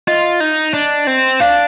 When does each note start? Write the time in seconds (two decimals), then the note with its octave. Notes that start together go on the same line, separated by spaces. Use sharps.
0.08 F4 D#5
0.40 D#4
0.74 D4
1.07 C4
1.40 D4 F5